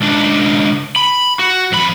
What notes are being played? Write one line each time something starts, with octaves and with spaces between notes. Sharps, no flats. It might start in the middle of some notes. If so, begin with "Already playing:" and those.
C#2 D4
B5
F#4
F2 B5